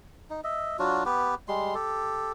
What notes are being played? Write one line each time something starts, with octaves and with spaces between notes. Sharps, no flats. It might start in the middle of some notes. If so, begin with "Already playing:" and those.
D#4
D#5 E5
F#3 D4 F4 F#4
B3 G4 B4
G3 G#3 C6
G4 A4